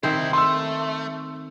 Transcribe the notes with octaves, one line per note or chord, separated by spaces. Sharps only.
C3 D#3 C4 E4 C5
A3 C6 E6